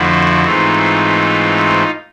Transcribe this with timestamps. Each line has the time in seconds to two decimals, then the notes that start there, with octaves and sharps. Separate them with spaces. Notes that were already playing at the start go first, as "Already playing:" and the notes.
Already playing: F2 D3 F3 A3 E4 F#4
0.44 G#2 E3 A3 C4 D#4 F4